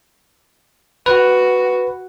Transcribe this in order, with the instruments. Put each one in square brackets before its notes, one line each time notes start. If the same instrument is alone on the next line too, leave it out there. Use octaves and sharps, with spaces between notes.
[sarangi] F#4 [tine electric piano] B4